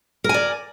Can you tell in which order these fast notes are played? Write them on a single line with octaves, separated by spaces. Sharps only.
A#4 G#5 D5